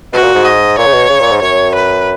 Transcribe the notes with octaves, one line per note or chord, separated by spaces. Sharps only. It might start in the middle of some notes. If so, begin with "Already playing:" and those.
B2 F#4
A#2
G#2
D#5
A#2 C#5
C#3
B2
C#3
A#2
G#2
F#2 C#5
B4